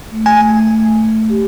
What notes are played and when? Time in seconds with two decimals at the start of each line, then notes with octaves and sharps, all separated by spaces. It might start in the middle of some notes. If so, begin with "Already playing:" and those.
0.11 A3
0.26 G#5
0.41 A3
0.70 A3
1.00 A3
1.30 G4